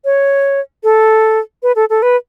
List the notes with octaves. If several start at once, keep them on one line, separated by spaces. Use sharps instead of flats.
C#5
A4
B4
A4
A4
B4